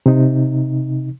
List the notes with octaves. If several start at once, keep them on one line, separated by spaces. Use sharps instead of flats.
C3 D#4